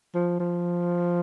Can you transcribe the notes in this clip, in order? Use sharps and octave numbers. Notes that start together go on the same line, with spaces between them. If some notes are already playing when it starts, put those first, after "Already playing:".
F3
F3